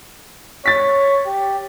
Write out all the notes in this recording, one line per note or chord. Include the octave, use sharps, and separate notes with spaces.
C#5 A6 B6
G4